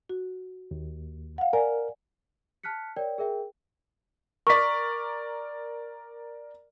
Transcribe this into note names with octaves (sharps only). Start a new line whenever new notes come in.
F#4
D#2
F5 F#5
A#4 D5 G#5
A5 F6 F#6 B6 C#7
A#4 C#5 D5 G5
G#4 A#4 E5 G5
A#4 D5 C#6 B6